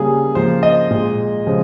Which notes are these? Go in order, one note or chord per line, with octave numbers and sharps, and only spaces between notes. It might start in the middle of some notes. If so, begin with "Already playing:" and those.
Already playing: C#3 G3 A#3 G#4
C#3 F3 A#3 C5
D#5
A#2 G#3
C#3 F3 G#3